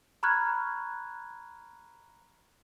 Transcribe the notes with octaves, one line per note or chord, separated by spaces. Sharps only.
A#5 B5 C#6 F6 F#6 G#6